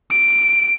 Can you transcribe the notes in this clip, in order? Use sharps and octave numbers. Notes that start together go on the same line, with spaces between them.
D7